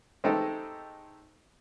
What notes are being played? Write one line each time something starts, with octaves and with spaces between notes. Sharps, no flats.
G#3 A3 C4 D#4 G4 A4